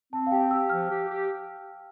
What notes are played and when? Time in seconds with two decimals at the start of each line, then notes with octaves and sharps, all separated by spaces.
0.13 C4 A5
0.27 F5
0.32 G4 G5
0.51 G4 E6
0.69 F3 F6
0.89 G4
1.09 G4